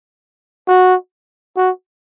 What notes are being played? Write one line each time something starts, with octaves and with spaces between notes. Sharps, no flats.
F#4
F#4